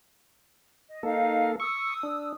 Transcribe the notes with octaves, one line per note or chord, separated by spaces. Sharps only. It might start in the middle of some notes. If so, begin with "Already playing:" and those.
D#5
A#3 D#4 A4 F5
C#6 D#6 E6
D4